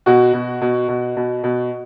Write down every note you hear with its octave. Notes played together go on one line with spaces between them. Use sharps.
B2 F#4
B2
B2
B2
B2
B2